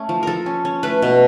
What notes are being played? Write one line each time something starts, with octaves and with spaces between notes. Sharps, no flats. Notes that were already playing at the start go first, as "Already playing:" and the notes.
Already playing: A3 C#4
F3
F3 A4 A#4
C#4
C#4
A3 B4
B2